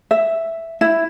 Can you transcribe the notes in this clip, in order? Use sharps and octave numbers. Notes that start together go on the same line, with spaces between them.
E5
E4